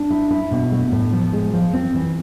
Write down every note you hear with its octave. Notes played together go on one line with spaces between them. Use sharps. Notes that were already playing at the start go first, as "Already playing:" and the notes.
Already playing: D4
E4
E4
B2
A3
A2
F3
G#3
F3
C4
E3